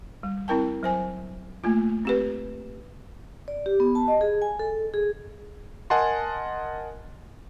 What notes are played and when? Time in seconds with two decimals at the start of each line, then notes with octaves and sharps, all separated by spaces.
0.23 G3
0.48 C4 E4 A#4 G5 A5
0.83 F#3 C5 G#5
1.64 A3 A#3 F4
2.05 C4 G4 B4
3.48 D5
3.66 G4
3.80 B3
3.95 A5
4.08 D#5
4.21 G#4
4.42 G#5
4.59 A4
4.94 G#4
5.90 A#4 D#5 F#5 G#5 A5 C6